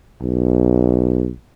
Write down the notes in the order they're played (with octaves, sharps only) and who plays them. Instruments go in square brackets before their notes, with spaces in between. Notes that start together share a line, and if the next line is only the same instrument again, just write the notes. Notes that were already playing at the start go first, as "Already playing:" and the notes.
[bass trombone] B1